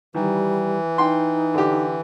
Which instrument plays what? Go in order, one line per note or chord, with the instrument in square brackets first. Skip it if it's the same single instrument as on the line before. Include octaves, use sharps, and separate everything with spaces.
[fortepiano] D#3 [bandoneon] E3 [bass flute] G3
[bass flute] D#4 [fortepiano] G5 C6
[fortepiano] D3 G4